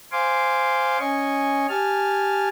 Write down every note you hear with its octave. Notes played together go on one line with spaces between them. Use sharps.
C5 F5 G#5 C6 D6
C#4 D#5 G#5 C#6
G4 G#5 A5 F6